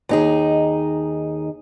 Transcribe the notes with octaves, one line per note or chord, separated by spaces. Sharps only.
D#2 D#4 G#4